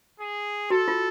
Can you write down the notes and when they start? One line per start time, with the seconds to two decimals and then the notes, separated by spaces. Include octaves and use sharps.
0.20 G#4
0.70 F#4 A4
0.88 F4